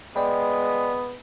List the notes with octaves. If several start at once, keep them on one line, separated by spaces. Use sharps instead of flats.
G#3 B3 D5 G5 B5